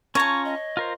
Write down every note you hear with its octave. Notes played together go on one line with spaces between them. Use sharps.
C#4 F4 C#5 A5 A#5 C#6
D#5
F4 A#4 C5